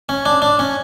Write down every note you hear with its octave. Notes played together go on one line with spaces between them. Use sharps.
C#4
D4
D4
C#4